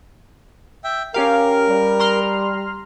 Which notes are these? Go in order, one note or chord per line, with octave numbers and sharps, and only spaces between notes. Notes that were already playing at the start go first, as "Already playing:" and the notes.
E5 G5
C#4 G4 A#4 F5
G3
A#5 C6 F6